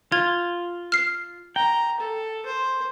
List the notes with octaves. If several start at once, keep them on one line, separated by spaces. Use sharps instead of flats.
F4 G#6
F6 C7
G5 A#5
A4
C5